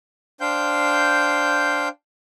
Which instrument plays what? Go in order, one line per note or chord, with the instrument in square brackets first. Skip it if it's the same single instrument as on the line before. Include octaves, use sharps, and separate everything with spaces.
[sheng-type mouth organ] D4 C5 F5 G5 G6